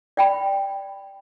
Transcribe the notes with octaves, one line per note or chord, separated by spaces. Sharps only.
D5 G5 B5